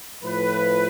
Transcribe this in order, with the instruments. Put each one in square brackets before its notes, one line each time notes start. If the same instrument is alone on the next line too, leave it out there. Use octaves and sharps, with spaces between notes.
[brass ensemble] A2 F3 B4